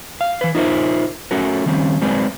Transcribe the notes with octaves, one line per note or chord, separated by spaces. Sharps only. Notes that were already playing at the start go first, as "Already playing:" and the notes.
F5
E3 B4
D#4 F4 A#4 C5 E5
A3 C#4 F#4 A#4
D#3 G3 C4 C#4
F#3 G#3 C4 B4 D5